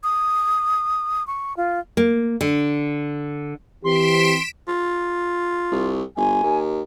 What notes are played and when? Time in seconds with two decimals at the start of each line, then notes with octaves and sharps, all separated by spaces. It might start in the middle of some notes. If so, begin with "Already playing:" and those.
0.03 D#6
1.27 C#6
1.57 F4
1.97 A#3
2.41 D3
3.84 E3 C4 G4 C6 B6 D7 E7
4.68 F4
5.72 C2
6.17 G1 G#5
6.43 D#2